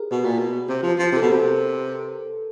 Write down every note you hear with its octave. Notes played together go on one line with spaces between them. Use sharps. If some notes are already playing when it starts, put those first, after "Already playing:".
Already playing: G4 G#4 A#4
B2 B4
A#2
B2
C3
F3
F3
C3 A4
B2
C3 A#4